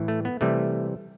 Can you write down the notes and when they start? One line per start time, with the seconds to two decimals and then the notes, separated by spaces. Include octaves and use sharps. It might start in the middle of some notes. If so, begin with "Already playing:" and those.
Already playing: A2 E3
0.08 A3
0.25 B3
0.41 C3 E3 G3 A3